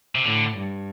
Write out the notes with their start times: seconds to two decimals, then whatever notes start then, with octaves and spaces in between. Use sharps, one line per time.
0.15 C3
0.25 A2 D3
0.56 G2